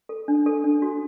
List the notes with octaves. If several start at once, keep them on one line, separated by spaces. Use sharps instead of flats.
A4
D4
A4
D4
F#4